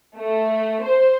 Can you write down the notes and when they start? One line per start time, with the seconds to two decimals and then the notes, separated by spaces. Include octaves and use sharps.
0.17 A3
0.83 C5